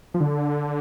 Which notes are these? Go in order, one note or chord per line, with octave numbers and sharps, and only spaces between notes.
F3
D3